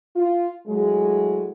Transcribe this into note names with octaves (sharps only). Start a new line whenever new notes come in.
F4
A2 F#3 G#3